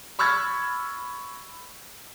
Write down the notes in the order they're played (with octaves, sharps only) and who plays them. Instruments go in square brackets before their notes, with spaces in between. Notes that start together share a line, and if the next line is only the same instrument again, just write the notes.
[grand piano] B5 C#6 E6 F6 G#6 A6